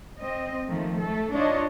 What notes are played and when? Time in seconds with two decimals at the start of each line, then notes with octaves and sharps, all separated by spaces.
0.19 C4 D#5
0.67 D#3 F3 A3 A#3
0.98 A3 A4
1.33 D4 D#4 F4 C#5 D#5